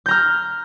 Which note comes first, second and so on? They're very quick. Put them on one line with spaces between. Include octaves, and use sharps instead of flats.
G6 A#5 F6